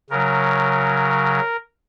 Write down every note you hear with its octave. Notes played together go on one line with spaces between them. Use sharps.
C#3 F#3 A#4